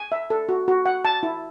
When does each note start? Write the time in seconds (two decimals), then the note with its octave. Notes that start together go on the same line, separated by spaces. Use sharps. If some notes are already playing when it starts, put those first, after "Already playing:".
Already playing: G#5
0.12 E5
0.30 A4
0.49 F#4
0.68 F#4
0.86 F#5
1.05 A5
1.23 E4